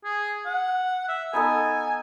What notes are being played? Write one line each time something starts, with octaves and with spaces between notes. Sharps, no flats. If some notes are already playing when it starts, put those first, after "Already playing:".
G#4
F#5
E5
B3 D#4 A4 G#5